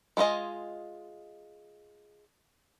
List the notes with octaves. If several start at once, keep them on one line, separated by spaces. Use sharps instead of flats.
G#3 B3 F4 D#5 G#5